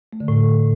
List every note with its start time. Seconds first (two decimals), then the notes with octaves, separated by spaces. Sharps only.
0.13 A3
0.20 D3
0.28 A2